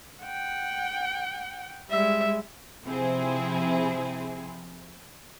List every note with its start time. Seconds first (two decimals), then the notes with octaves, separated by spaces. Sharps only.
0.24 F#5 G5
1.90 G3 G#3 E5
2.86 C3 F3 C4 E4 G#4